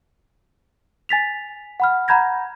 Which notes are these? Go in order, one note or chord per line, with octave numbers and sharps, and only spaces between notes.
G#5 A6 B6 F7
F#5 B5 F6
F#5 A#5 B5 G6 G#6 A#6